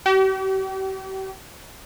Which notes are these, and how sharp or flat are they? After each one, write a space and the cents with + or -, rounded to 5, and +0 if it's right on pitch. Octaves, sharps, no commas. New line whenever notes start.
G4 -45